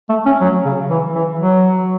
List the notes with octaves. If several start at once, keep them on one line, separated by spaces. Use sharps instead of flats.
A3
C#4
F#3
C#3
E3
E3
F#3